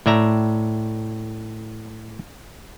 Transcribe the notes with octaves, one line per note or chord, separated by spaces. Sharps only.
A2 D5 E5 A#5